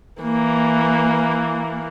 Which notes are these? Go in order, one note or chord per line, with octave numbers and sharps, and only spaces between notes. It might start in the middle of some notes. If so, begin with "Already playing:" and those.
E3 A#3